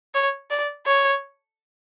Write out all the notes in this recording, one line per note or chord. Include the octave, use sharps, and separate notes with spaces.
C#5
D5
C#5